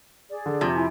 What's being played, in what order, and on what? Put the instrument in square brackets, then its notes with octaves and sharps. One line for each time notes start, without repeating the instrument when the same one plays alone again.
[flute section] G#4 D5
[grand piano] D3
[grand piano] F2 [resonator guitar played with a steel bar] C3
[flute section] E4 G#5